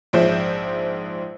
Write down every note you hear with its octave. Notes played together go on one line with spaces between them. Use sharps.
A#1 G#2 F3 C5 E5 G6